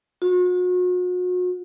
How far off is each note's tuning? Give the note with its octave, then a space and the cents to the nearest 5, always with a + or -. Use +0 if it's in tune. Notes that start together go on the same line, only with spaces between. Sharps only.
F#4 -40